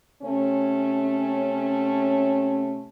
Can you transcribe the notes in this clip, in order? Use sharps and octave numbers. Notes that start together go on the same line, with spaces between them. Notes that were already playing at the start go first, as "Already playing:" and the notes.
C3 A3 C4 C#4